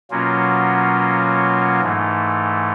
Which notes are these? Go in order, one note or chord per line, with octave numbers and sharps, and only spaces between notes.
B2 F#3 A#3 C#4 F4
G#2 E3 A3